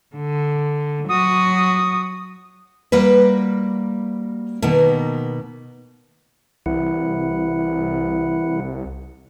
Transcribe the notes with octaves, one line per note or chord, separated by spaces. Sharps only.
D3
F#3 F#4 D#6
G3 A#3 F#4 B4
B2 D#3 A#3 B3
C2 E3 E4 F#5